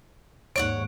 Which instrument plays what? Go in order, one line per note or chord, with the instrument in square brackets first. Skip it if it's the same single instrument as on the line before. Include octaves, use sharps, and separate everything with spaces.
[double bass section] D#2 G#2 [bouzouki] C#5 D5 F#5 [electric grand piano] D7